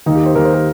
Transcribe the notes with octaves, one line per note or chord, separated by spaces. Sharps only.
D#2 D#3 D#4
G4
C5
D#2 D#3 A#4
C5
A#4